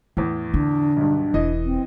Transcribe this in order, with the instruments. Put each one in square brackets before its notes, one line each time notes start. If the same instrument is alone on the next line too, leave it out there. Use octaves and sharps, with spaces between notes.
[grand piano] E2 A2 [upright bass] E3
[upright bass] D3 [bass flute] D4
[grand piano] B1 G2
[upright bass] E1 [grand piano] E3 D#5
[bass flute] C4